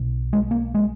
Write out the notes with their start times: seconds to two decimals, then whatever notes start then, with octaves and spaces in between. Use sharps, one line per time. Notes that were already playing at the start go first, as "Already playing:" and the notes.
Already playing: B1 B2
0.33 G#3
0.51 A#3
0.74 G#3